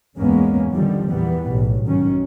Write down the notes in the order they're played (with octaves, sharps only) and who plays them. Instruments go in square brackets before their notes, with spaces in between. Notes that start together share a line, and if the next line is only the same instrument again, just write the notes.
[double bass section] E2 G#2 G#3 A#3 B3 C#4
D3 D#3 F3 G3
E2 A#2 E3 G3 B3
B1 A2
G#2 D#3 F#3 C#4